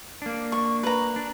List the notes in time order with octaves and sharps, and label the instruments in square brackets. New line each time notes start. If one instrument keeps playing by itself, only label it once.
[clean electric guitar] A#3 D4
[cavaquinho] C#6
B4 A#5
[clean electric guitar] D4